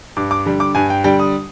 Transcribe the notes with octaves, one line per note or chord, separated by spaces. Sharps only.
G2 D6
D6
D3 G3
D6
G2 G#5
G5
D3 G3 G5
D#6